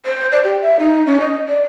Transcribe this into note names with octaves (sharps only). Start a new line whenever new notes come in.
C5
D5
G4
E5
D#4
C#4
D#5
D5